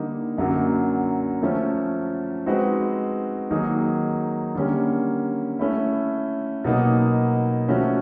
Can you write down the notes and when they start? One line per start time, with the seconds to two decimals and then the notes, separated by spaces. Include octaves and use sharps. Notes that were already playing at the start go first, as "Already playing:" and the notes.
Already playing: D3 G3 A#3 D#4 G4
0.38 F#2 D3 F#3 A#3
1.43 F3 A3 C#4
2.46 G#3 C4 D#4 F#4 B4
3.51 D#3 F#3 A#3 D#4 G#4
4.55 D3 G3 A#3 C#4
5.59 A3 C#4 E4
6.64 B2 F#3 A#3 D#4
7.68 F3 A3 C#4 F#4